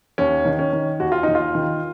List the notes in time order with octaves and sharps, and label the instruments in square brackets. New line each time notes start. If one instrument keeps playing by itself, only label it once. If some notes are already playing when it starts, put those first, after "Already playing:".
[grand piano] D#2 C#4
D#3
C#4
D#3
D#2 F#4
F4
D#4
D#2
F4
D#3